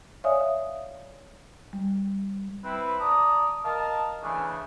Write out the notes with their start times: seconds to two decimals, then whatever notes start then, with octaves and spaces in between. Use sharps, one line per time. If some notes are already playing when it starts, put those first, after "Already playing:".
0.24 C#5 D5 E5 F5 G#5 D#6
1.73 G3
2.64 C4 E4 B4
3.01 D5 A5 A#5 D#6
3.65 A#4 D#5 F5 A5
4.23 C#3 E3 A3 C#4 D4 G#4